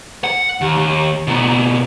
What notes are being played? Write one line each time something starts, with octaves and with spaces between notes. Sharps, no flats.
F#5
D#2
D#2
B2 A#3